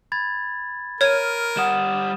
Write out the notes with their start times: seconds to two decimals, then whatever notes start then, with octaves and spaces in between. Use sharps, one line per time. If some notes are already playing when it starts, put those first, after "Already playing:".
0.12 B5 G#6 A6
1.01 A#4 C#5 F6 G#6 D#7
1.57 G3 F#5 D#6 E7